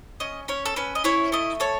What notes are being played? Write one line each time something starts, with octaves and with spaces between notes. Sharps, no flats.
C#4 D#5
C#4 C#5
A4
C#4 B4
D#5
E4 C#5
A3 D#5
A4 C#5